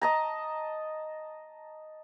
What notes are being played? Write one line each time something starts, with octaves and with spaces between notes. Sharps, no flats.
D#5 A5 A#5